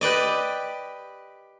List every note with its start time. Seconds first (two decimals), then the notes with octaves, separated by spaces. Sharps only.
0.01 G4 B4 D5 D#5